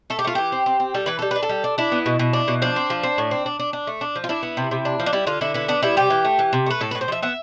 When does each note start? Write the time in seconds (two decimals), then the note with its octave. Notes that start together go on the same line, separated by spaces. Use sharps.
0.10 A3 A4
0.19 G4
0.24 A3 F4
0.35 E3 G4
0.52 C4
0.66 C4
0.80 C4
0.94 G3 A4
1.06 E3 B4
1.19 G3 A4
1.31 D4 B4
1.43 A4
1.49 G3
1.64 D4
1.78 D4 E4
1.92 B3
2.06 B2
2.19 B2
2.33 D4
2.48 B2
2.62 F3 D4
2.76 C4
2.90 F3
3.03 C4
3.18 A2
3.31 C4
3.46 D4
3.59 D4
3.73 D4
3.87 A3
4.01 D4
4.16 F3
4.24 F4
4.29 D4 E4
4.43 B3
4.57 C3
4.71 C3
4.85 D4
5.00 F3
5.06 D4
5.13 G3 E4
5.27 D3 F4
5.41 D3 E4
5.54 B3 E4
5.68 B3 D4
5.82 G3 E4
5.97 C3 G4
6.10 E3
6.25 A3
6.39 E3
6.53 C3
6.66 A3 B4
6.81 A2 A4
6.91 A2 B4
7.01 C5
7.08 F3 E5
7.22 B3 E5